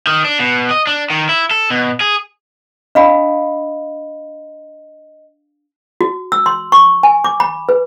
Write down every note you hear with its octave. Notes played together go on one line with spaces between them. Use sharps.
D#3
D4
B2
D#5
D4
D#3
E4
A4
B2
G#4
D4 D#5 F5 B5
F#4
E6
C6
C#6
G#5
D6
B5
B4